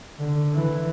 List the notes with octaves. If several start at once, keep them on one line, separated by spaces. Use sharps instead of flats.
D3
E3